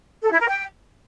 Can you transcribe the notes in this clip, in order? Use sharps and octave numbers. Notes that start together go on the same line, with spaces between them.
A4
E4
A#4
G5